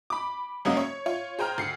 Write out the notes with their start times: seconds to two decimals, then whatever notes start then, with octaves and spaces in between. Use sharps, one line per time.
0.10 B5 D6
0.65 F#2 C#3 F#3 G#3 A#3 C#4
0.77 C#5
1.06 F4 C#5
1.39 G#4 C5 G5 A#5 F6
1.58 D2 C7 C#7